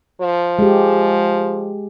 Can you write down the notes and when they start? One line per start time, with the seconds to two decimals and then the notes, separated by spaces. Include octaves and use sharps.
0.21 F3
0.59 G#3 G4